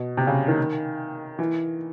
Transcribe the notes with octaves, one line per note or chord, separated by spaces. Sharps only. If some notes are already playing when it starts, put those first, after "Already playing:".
Already playing: B2
C3
C#3
D#3
E3